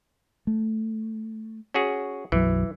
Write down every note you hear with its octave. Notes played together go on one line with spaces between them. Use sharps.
A3
C#4 F#4 G#4
B1 F#2 E3 F#3